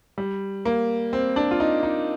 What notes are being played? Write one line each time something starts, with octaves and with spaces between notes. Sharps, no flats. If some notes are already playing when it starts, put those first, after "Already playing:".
G3
A#3
C4
D4
F4
D#4
D#4